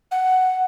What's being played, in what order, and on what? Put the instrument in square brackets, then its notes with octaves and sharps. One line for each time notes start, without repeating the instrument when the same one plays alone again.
[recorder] F#5